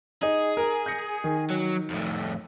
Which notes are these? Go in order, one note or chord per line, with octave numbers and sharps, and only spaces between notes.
D#4 G#4
A#4
G6 A#6 C#7
D#3
F#3
F2 A2